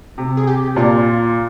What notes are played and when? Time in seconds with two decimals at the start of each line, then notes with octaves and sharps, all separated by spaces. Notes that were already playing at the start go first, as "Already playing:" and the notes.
0.18 C3
0.37 G#4
0.47 G4
0.76 A#2 F4